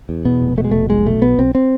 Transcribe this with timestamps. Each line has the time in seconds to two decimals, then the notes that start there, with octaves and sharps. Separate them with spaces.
0.09 E2
0.25 B2 B3
0.42 F1
0.57 B2 A3
0.64 G#3
0.71 F1 A3
0.89 B1 G#3
1.06 B2 A3
1.22 B1 B3
1.38 B1 C4
1.55 C4